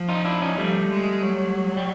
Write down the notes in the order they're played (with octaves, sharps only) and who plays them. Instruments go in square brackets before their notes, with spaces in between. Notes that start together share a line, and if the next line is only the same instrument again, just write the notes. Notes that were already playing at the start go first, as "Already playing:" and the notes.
Already playing: [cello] F3
[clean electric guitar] D#4 F4
D4 E4
C#4 D#4
[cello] F3 [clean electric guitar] G3 A3
[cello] G#3
F#3
[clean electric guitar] G3